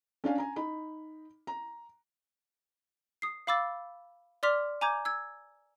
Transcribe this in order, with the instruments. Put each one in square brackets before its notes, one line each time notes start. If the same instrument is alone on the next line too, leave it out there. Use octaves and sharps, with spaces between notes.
[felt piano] C#4 D4 F5 G#5
G#5 A#5
D#4 B5
A#5
[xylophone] D#6 C7
F5 B5 D6 E6 A6
D5 C6 D6 F6 B6 F7
G#5 A#5 D6 G6 G#6
E6 G#6